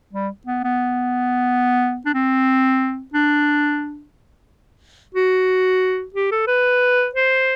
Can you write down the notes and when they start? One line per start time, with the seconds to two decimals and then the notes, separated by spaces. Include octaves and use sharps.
0.13 G3
0.47 B3
0.64 B3
2.06 D4
2.14 C4
3.14 D4
5.15 F#4
6.14 G4
6.32 A4
6.48 B4
7.15 C5